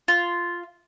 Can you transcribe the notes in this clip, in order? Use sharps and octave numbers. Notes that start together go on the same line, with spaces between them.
F4